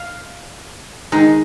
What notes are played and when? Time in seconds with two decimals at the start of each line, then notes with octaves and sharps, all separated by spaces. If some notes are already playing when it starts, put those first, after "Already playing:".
Already playing: F5
1.12 D#3 G#3 D#4